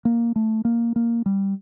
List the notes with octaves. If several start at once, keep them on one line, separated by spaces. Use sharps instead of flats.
A#3
A3
A#3
A#3
G3